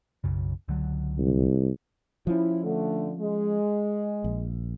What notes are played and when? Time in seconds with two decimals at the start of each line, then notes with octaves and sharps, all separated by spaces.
0.24 B1 F#2 C#3
0.68 C#2 D3 F#3
1.19 C2
2.27 F3 C#4 E4
2.64 D3 A3
3.20 G#3
4.24 A#1